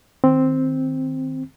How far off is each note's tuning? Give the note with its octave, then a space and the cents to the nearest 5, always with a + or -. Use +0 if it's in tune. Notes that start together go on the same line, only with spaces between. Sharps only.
D#3 +0 C4 +0